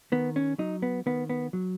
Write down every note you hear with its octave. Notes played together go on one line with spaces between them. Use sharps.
D#3 B3
C#4
F#3 D#4
B3
D#3 B3
B3
F#3